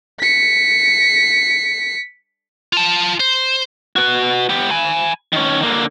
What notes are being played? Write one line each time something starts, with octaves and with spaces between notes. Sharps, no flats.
B6 C#7
F4 A5
C5
F#4 B4
B3 G4
G#5 B5
D#3 C#4
D3 A#3